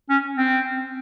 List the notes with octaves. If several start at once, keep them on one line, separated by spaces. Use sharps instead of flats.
C#4
C4